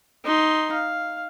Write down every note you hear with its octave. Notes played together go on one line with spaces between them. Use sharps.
D#4 C6
F5